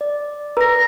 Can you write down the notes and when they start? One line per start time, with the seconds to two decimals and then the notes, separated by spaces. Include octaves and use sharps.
0.01 D5
0.57 B4 A#5 A#6